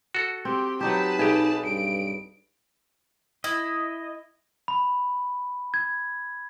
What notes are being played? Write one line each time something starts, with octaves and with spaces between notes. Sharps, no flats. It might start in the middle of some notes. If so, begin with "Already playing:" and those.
F#4 A4
C4 G4
F#3 D#4 G4 B4 A5
B1 D#4 G4 G#4
G2 D7
E4 D#5
B5
G#6